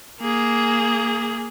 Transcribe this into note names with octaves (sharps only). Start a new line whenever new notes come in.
A#3 G#4